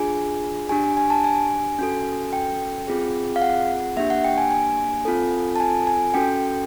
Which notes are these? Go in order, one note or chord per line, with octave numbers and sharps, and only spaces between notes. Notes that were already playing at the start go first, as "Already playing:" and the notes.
Already playing: D4 F4 G#4 G#5
D4 G4 G#5
G#5
G#5
A5
G#5
C#4 F#4 A4
G5
C4 F4 G#4
F5
F#5
A#3 D4 G4 E5
F#5
G5
G#5
G#5
C4 F4 A4
A5
G#5
G#5
C#4 F#4 A4 G5